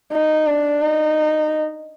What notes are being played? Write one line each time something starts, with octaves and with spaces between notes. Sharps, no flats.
D#4
D4
D#4